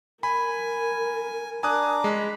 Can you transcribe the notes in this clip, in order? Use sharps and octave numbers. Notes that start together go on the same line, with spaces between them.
A#4 G#5 B5
D4 G#5 A#5 D6 D#6 F#6
G#3 B5